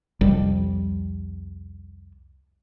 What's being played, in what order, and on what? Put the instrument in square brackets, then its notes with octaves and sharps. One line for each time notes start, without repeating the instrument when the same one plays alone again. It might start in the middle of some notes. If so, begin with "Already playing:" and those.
[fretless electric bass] C2 F2 G3